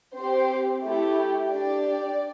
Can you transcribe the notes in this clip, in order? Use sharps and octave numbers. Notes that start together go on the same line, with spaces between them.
C4 G4 C5
A3 E4 G4
D4 G4 D5